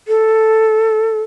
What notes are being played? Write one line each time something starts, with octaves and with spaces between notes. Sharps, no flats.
A4